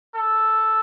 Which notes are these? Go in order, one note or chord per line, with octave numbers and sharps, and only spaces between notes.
A4